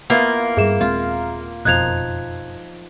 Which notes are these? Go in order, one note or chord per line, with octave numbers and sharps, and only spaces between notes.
A#3 B3 E4 F4
G2 G3 G#4 E5 E7
D#1 G#3 C4 F4
F#1 F2 B2 F3 D#4 F#6 G#6 F7